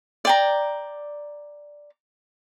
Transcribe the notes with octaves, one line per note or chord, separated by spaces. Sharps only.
D5 G5 A#5